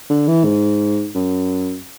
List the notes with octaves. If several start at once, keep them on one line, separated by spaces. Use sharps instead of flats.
D3
E3
G#2
F#2